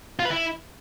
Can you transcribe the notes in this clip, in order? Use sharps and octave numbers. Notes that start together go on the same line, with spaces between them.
F4
B4
E4